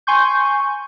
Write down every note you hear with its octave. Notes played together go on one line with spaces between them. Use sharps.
G#5 C6 C#6 G6